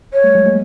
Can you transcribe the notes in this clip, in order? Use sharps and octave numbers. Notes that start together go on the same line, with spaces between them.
C#5
G3 A3
F#3 G#3
G#3 A#3